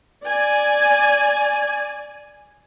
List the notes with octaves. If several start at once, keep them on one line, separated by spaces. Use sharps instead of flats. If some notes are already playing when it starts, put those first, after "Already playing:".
D5 G#5